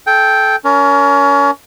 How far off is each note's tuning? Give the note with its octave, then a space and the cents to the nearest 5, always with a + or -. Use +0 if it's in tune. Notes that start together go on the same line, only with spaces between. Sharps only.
A4 -25 G5 +0
C#4 +30 A#4 +0